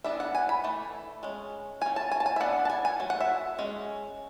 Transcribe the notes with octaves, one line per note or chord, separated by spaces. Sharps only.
E3 B3 D4 E5
F#5
G#5
B5
E3 A3
G#3 C#4
F#3 C#4 G#5
A5
G#5
A5
G#5
E5
E3 B3 D4 F#5
A5
G#5
G#5
F#3 A3
F#5
E5
G#3 C#4